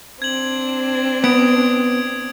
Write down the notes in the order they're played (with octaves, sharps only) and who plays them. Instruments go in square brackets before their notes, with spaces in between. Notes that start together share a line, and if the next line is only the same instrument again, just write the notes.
[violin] C4 D4 [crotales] G#6 F#7
[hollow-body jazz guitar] B3 [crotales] D#6 G#6 D7